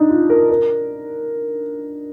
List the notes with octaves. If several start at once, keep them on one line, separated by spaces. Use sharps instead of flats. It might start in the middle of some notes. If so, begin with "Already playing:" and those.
Already playing: D4 D#4
F4
A#4
A#4